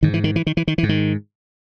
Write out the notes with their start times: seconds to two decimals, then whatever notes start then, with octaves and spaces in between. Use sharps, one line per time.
0.03 G#2 D#3
0.14 E3
0.24 D#3
0.36 E3
0.47 D#3
0.57 E3
0.68 D#3
0.78 E3
0.83 G#2
0.89 D#3